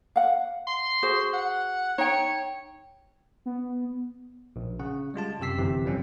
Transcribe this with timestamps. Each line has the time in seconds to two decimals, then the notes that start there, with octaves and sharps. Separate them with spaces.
0.16 F5 F#5
0.67 C6
1.03 F#4 G#4 C5
1.33 F#5
1.98 D#4 C#5 G5
3.46 B3
4.56 A#1
4.79 C#3 F#5
5.14 G3 G#3 F4 A5
5.40 F#2 C3 G4 E6 B6 C7
5.58 G1 C3 E3 G4
5.84 F2 F3 G3 C4 C#4